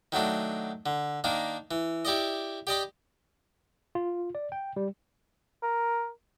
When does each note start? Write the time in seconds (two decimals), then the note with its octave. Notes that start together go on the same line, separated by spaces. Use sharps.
0.12 D#3 F#3 A3 D4
0.86 D3
1.24 D#3 A#3 D4
1.71 E3
2.05 E4 G4 D5 D#5
2.67 G4 D5 D#5 B5
3.95 F4
4.35 D5
4.52 G5
4.76 G3
5.62 A#4